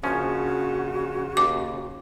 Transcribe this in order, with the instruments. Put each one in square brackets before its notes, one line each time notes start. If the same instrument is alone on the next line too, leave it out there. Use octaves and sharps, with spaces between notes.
[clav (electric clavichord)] A#1 F3 C#4 [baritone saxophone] C#3 [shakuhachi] F#4
[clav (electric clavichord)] D#2 [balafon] D6